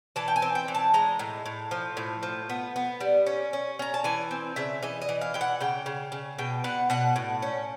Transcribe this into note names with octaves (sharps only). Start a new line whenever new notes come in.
E3 A5
G5
G#5
C4
G5
E3
A5
G#3 A#5
A2
A2
F3
A2
F3
B3
B3
G3
C#4
C#4
C#4 A#5
A5
E3 G#5
C4
C#3 E5
E3 D#5
D#5
E3
F5
E3 G5
F#5
C#3 G5
C#3
C#3
B2 G5
B3 F#5
B2 F#5
A2
C#4